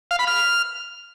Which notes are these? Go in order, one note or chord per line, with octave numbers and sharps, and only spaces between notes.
F5
B5
F6